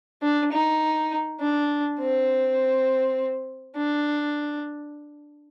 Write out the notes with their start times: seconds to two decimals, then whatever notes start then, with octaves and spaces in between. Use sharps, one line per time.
0.22 D4
0.52 D#4
1.41 D4
2.00 C4
3.77 D4